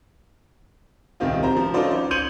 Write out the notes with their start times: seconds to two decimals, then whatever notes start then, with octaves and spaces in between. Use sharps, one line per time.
1.20 D#1 C2 D#3 C4 F4
1.43 C5 A#5
1.57 F3
1.74 C#4 D#4 F4 A4 C5 D5
1.91 C5
2.11 C6 G6 G#6 C#7 D#7 F#7